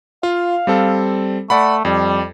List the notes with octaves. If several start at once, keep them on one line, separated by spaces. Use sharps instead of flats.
F4 F5
G3 C4 A4
A3 D5 F#5 B5
F2 G3